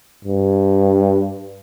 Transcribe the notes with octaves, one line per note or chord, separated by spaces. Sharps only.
G2